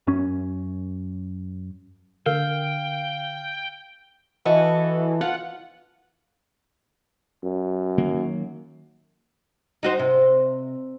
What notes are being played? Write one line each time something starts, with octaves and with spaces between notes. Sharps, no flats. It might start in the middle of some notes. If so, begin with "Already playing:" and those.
F#2 C#4
D3 A#4 F5 G5
E3 F#4 A4 D#5
F4 F#5
F#2
D#3 F#3 A#3
D#4 F#4 C5
C3